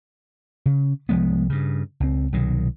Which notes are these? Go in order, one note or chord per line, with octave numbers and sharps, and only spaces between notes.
C#3
C2 F3 G#3 B3
G2 C#3
C#2 C4
C2 B2 D#3 F#3